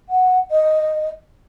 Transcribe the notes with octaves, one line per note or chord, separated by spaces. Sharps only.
F#5
D#5